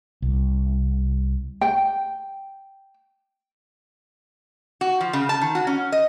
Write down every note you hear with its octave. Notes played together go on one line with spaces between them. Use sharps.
C2
G5
F#4
F3
C#3
A5
D#3
F#4
C#4
D#5